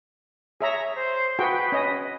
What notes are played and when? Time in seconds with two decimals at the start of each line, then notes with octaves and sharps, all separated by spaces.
0.61 G#4 C#5 E5 A#5
0.94 C5
1.39 F#4 G#4 B4 G5
1.72 C#4 D#5